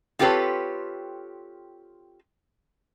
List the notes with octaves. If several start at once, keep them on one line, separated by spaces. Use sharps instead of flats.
C4 F4 G4 A4 B4 C#5